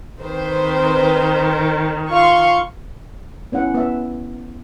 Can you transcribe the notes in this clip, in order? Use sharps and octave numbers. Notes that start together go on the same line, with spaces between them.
D#3 C4 B4 C5
F4 F5 C6 C#6
B3 C#4 E4 F#5
B3 E5